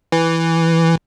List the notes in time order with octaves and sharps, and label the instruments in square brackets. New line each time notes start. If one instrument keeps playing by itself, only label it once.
[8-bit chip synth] E3